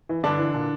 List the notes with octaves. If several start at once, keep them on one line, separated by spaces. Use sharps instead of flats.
E3
G2 D3 D4
E3
A#2